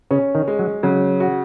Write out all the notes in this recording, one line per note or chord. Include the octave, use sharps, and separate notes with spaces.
C#3 C#4
D#3
G#3
F#3
C#3 F#3
F#4